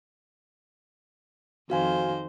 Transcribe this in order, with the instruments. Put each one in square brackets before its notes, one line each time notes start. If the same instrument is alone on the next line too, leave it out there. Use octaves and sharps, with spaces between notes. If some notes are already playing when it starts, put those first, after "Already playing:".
[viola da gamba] F2 D#3 C5 [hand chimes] F#4 F5 G#5